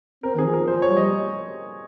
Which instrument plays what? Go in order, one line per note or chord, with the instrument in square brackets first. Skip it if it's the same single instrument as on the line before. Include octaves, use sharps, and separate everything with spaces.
[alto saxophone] C4 [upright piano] A#4
[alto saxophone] D#3 [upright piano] G#4
[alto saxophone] F3
[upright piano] A#4
[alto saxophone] F3 [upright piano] C5
[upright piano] C#5
[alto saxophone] G3
[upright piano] D#5